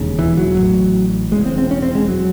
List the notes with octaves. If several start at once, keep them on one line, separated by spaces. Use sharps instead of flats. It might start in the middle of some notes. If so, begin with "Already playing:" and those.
Already playing: E1 D#2 C#3
E3
F#3
A1 A2
E1 E2 C#3 G#3
C4
C4
C#4
C4
G#3
F#3